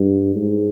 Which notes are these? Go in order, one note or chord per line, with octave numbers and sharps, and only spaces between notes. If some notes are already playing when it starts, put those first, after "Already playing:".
Already playing: G2
G#2